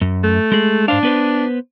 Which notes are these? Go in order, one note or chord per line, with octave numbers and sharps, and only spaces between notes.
F#2
A3
G#3 G#4
G#2 D4 C5 F5
B3 B4 C5